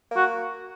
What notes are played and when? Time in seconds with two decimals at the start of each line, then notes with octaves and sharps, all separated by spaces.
0.11 A#3
0.16 F#4